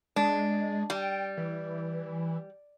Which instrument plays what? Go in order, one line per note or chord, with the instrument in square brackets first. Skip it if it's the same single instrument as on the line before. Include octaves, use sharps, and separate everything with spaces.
[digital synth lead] G#3 [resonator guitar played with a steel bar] D4
[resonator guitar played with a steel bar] G3 [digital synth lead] G5
[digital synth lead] E3